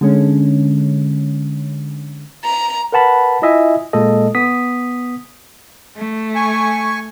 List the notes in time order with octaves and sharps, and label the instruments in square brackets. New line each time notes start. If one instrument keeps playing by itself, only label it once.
[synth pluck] D3 G#3 C#4
[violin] A#5
[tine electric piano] A#4 B4 F#5 A5 B5
E4 F4 D#5 E5 G#5
A#2 G#3 A#3 A4 D#5
B3 D#6 B6
[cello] A3
[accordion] G#5 C#6